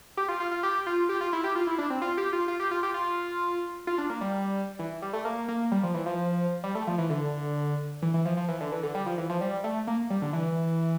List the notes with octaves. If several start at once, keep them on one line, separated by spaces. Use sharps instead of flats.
G4
F4
F4
F4
G4
F4
G4
F4
E4
G4
F4
E4
D4
C4
F4
G4
F4
F4
G4
F4
G4
F4
F4
D4
A#3
G3
E3
G3
A3
A#3
A#3
G3
F3
E3
F3
G3
A3
F3
E3
D3
E3
E3
F3
F3
E3
D3
E3
D3
G3
F3
E3
F3
G3
A3
A#3
G3
D3
E3